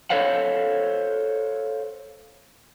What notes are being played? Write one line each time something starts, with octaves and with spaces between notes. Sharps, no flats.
A4 C5 C#5 F5 F#5